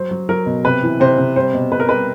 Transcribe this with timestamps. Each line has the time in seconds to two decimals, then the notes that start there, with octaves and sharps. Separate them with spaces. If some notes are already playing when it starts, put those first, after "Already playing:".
Already playing: F#3 C5
0.11 F#3
0.29 F#3 A#4
0.46 B2
0.64 C3 B4
0.83 E3
1.00 C3 C5
1.18 C3
1.36 G3 C5
1.53 B2
1.72 B2 B4
1.80 A#4
1.89 G3 B4